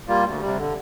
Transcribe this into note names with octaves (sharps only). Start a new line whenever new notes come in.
G3 A#3 F4
D2
C3 G3
D3